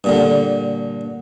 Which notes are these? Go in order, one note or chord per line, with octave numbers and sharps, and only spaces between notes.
G2 A#2 D3